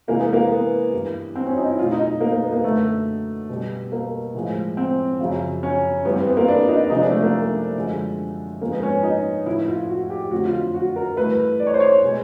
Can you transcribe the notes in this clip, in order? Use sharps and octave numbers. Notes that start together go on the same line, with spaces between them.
C3 E3 G#3 A#3
B3
A#3
B3
G2 E3 G3
C4
C#4
D#4
E4
B2 F#3 A3 F4
D#4
A#3
A#3
B3
A#3
F#2 D3 F#3 A3
B2 G3
A#3
A2 F3 G#3
C4
F#2 C#3 F3
C#4
G2 E3 G3 B3
C4
B3
A#3
D4
D#4
C3 F3 G#3 D#4
D4
A3
A#3
F#2 D3 F3 G#3
G#2 F3 G#3 A#3
B3
C#4
D#4
A2 F3 A3 E4
F4
F#4
G4
F2 D3 F#3 A3 F#4
F4
F#4
A#4
G2 E3 A3 B4
D5
C#5
C5
C#5
B2 G#3